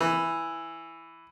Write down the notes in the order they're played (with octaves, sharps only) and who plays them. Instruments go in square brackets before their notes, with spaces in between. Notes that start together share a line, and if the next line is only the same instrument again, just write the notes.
[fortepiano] E3